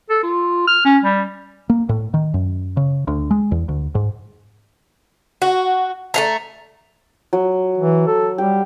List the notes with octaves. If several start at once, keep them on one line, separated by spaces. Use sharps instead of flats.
A4
F4
F6
C#4
G3
A#3
A2
D#3
F#2
C#3
D2
G#3
E2
D2
G#2
F#4
A3 F5 A#5
F#3
E3
A4
G3 G4